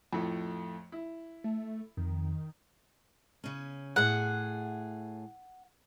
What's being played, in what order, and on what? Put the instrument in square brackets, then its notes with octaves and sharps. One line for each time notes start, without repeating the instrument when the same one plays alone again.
[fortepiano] F2 A2 A3
E4
[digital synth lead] A3
[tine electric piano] F2 [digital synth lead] D#3
[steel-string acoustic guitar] C#3 C#4
[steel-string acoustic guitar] A2 G#4 [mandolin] F#5